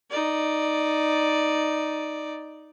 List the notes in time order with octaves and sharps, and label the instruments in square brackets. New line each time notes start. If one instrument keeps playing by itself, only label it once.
[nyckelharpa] D#4 D5